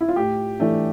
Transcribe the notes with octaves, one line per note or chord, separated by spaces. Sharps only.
E4
F4
A2 G4
E3 A3 D4